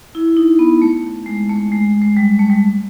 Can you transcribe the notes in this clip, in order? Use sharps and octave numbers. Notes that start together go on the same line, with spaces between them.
E4
D#4
B3
A3
G#3
A3
G#3
G#3
G3
A3
G3